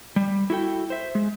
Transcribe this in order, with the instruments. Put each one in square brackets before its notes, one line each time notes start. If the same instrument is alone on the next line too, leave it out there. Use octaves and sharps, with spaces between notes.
[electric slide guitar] G3
E4 F#4 A4 G5
C5 E5
G#3